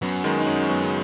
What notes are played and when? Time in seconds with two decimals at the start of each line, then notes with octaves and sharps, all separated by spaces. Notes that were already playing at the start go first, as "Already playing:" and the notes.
0.02 F#2 F#3 B3
0.24 D#3 G#3
0.40 D#4
0.47 G#3 C#4
0.61 G#3
0.69 F#3 B3
0.84 C#3